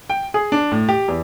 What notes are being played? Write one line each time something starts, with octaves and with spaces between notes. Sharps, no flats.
G5
G#4
D4
A2
G4
E2